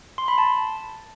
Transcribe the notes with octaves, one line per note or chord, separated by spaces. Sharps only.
C6
B5
A5